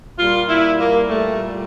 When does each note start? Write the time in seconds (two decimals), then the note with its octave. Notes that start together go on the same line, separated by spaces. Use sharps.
0.18 A#2 G3 F4
0.49 E4
0.79 A#3
1.09 A3